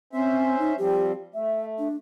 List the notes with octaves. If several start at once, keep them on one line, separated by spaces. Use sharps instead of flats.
C4 C#4 C5 E5
D#4
F3 G3 C4 G4
A3 E5
D4